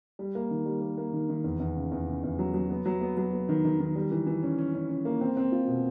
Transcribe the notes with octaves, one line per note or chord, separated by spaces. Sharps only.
G3
A#3
D#3
G3
A#3
A#3
D#3
D#3
E2
E2
C#3
E2
C#3
E2
F#3
F#3
B3
F#3
B3
F#3
B3
D#3
D#3
D#3
G3
E3
E3
C#4
C#4
C#4
C#4
A#3
C4
C4
F4
B2